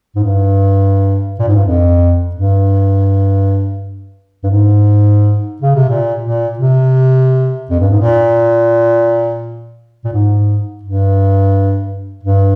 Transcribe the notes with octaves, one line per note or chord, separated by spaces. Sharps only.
G#2
G2
A#2
G#2
G2
F2
G2
G2
G#2
C#3
C3
A#2
A#2
C3
F2
G2
G#2
A#2
A#2
G#2
G2
G2